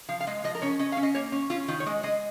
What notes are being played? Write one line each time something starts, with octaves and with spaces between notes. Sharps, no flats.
F3 F5
F5
G#3 D#5
F3 D#5
A#4
C#4 C#5
C#4 D#5
F5
C#4
D#5
A#3 C#5
C#4
C#4 F4
D#3 F4
C#5
G#3 D#5
G#3 D#5